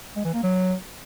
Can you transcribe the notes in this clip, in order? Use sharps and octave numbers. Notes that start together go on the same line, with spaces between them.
G#3
E3
A#3
F#3